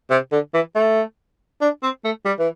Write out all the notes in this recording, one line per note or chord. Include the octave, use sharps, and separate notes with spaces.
C3
D3
E3
A3
D4
C4
A3
G3
E3